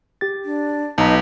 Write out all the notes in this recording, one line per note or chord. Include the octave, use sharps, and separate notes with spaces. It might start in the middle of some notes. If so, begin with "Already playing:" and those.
G4 A6
D4
B1 D#4 B4 A5 A#5